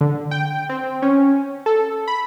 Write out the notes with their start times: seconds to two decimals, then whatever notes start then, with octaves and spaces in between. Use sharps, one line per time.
0.01 D3
0.31 G5
0.69 C4
1.02 C#4
1.66 A4
2.08 B5